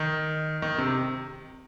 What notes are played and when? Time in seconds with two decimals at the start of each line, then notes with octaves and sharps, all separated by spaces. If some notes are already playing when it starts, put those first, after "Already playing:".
Already playing: D#3
0.62 D#3
0.78 C3